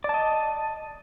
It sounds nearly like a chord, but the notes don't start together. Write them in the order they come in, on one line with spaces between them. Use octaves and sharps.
D5 A5 D#5